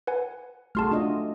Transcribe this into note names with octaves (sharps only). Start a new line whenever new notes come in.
B4 F#5 G#5
A3 F#4 G#4 A5 C6 F6
D4 F4 D#5